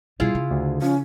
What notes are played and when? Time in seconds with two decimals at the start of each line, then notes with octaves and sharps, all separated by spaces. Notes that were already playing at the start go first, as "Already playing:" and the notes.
0.20 B2 G3 E4 F4 G#4
0.35 C#3
0.51 D2
0.82 F3 C#4